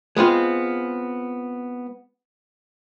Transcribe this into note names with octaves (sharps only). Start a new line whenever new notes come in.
G#3 B3 C4 F4